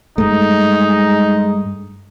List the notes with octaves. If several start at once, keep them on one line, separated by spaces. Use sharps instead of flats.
G2 G#3 A3 D#4